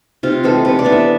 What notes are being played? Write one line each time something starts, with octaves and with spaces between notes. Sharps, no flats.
C3 F4
E3 G#3 C4 A4
C3 B4
D5
E3 B3 D4
E5